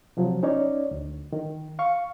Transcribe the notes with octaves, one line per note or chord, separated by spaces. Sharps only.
C3 F3 F#3
C#4 D#4 C#5 D5
D2
D#3
F5 C#6